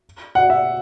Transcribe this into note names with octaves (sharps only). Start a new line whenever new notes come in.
F#5
E5